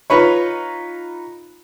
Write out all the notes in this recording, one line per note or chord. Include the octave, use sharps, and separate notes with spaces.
D#4 F4 B4 C#5